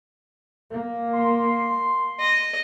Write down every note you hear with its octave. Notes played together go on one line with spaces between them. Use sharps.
A#3
C6
D#5